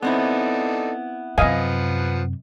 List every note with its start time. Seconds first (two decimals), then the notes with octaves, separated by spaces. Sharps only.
0.03 B3 C4 D#4 E4 A4 D5
1.38 F#2 C3 F3 B4 D#5 F5 F#5 G#5